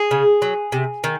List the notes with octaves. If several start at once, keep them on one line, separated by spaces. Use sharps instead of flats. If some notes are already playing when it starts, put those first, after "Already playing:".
Already playing: G#4
C#3
F#3
C3
D#3